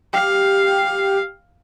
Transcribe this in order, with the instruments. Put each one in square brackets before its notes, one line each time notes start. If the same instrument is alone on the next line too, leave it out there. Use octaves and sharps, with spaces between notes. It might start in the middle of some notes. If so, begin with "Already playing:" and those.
[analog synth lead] G4 [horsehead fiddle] F5